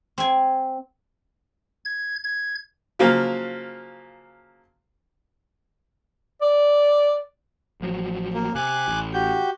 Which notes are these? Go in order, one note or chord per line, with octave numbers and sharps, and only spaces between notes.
C4 G#5
G#6
G#6
C#3 F3 F#3 A#3
D5
A1 F3 F#3
A#3
C3 G#5 D6 F#6
A1
F#4 G4 G6